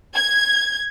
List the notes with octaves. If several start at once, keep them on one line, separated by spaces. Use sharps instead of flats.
G#6